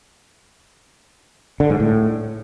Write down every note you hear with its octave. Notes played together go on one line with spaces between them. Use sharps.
D3
G#2
A2